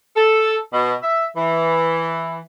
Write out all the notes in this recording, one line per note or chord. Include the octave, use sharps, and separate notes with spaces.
A4
B2
E5
E3